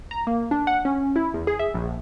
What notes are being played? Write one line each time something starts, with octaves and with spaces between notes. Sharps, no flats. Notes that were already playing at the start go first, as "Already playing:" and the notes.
A#5
A#3
D4
F#5
C#4
E4
E2
G#4
E5
A#1